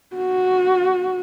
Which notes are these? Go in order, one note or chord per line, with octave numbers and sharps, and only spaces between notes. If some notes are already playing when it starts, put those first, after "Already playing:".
F#4